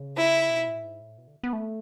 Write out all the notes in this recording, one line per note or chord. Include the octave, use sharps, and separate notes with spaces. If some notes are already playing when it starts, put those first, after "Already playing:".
Already playing: C#3
E4
B2
A2
G#2
A2
B2
D3
B3
A3